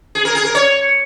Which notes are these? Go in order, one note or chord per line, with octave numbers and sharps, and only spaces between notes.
G#4
A#4
G#4
A#4
C#5